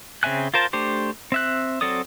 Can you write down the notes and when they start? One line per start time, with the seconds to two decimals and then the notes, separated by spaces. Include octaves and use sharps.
0.23 C#3 C4 E5 G#5 F#6
0.54 F4 A#4 C5 A5
0.73 A3 D4 G4 C5
1.32 C4 E5 F#6
1.81 F#3 C4 A4 D5 D#6